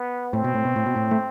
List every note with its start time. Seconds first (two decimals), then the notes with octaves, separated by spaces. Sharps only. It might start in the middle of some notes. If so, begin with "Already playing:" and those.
Already playing: B3
0.33 A2 C4
0.44 B2
0.55 A2
0.65 B2
0.76 A2
0.86 B2
0.96 A2
1.11 A3